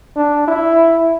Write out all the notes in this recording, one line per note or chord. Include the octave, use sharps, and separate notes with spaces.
D4
E4